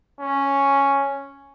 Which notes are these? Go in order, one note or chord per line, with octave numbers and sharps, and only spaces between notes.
C#4